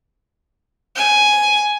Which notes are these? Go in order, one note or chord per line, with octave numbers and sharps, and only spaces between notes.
G#5